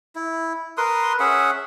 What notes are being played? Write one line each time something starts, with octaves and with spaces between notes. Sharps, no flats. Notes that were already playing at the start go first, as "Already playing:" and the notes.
E4
A#4 B4 C6 D#6
C#4 G#4 E5 F#5